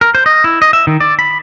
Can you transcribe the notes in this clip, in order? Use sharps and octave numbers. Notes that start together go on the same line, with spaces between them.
A#4
C5
D#5
E4
D#5
E5
D#3
D5
B5